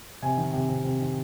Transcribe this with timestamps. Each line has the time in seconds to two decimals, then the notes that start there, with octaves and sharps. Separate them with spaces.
0.22 C3 G#5
0.37 D#3
0.53 C3
0.69 C3
0.84 C3
1.01 D#3